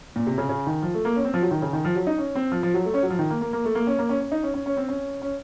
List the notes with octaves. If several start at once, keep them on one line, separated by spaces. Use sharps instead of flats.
A#2
C3
C#3
C#3
D#3
F3
A3
A#3
C#4
C4
F3
F#3
D#3
C#3
D#3
F3
F#3
D#4
C#4
C4
F3
F3
F#3
A3
C#4
F#3
F3
D#3
A#3
A#3
A#3
A3
A#3
C#4
A#3
C#4
C#4
D#4
C#4
C#4
C#4
C4
C#4
C#4